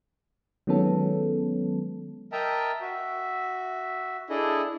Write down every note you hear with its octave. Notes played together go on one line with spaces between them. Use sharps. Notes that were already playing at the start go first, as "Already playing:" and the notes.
D#3 F#3 G#3 B3 C#4 A4
A#4 D#5 E5 G5 A5 A#5
F#4 E5
D4 E4 G#4 A4 D#5